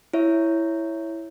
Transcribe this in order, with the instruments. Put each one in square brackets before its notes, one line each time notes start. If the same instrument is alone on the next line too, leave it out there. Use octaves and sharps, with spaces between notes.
[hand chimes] E4 C#5 E5